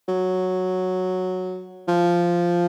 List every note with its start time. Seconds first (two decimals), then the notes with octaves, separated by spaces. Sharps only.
0.08 F#3
1.88 F3